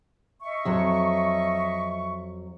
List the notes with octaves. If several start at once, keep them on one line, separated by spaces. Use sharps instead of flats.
D#5 E5 C#6
F2 F#3